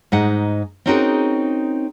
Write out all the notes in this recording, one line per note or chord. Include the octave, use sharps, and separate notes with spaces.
G#2 D#4 F#5
C4 C#4 D#4 F#4 G#4 A#4